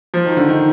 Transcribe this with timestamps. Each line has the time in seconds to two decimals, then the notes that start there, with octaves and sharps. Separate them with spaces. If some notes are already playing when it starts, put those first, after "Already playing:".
0.14 F3
0.26 D#3
0.37 D3
0.49 D#3